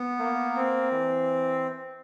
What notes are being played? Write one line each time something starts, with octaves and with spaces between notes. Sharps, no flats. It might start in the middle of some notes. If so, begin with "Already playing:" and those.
Already playing: B3
A#3
C4
E3